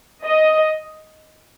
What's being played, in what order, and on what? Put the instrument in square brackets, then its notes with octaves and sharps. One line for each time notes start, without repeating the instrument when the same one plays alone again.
[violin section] D#5